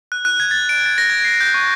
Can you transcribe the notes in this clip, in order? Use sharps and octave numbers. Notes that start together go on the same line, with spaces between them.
F#6
F#6
G#6
A6
D7
A6
A#6
G#6
C7
G6
C#6